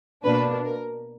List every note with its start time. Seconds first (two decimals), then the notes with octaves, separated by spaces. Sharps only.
0.24 B2 A#3 D4 B4
0.65 A#4